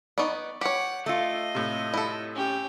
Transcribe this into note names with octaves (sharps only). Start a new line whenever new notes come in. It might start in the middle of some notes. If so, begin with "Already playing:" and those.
B3 D#4 D5 C#6
G4 C#5 F#5
A3 F4 D#5
A2 C3
E4 A4
C#4 G4